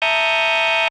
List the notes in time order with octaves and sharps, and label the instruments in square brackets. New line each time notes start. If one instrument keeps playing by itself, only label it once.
[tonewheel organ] E5 A5 A#5 C#6 D#6 G6